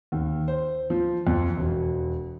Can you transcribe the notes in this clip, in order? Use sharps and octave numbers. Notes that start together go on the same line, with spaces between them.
D#2
C5
F3
F2
E1